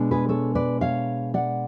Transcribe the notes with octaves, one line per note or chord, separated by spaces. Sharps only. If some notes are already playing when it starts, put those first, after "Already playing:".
Already playing: B2 G#3 D4
G#4 B4
A4 C#5
B4 D5
C#5 F5
D5 F#5